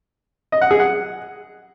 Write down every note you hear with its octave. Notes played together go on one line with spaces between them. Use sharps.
D#5
F#5
G#4
F#5